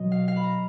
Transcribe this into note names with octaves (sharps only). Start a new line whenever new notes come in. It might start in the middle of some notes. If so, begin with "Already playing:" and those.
Already playing: B2 F#3 D#5
F5
F5
B5
A#5